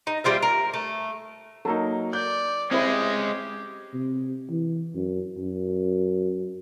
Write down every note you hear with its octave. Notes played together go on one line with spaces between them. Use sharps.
D#4
G3 C4 F4 E5
A#4
A3
F#3 A#3 D#4 A4
D5 G6
G#3 C4 C#4 E4 G4 B4
C3
E3
F#2
F#2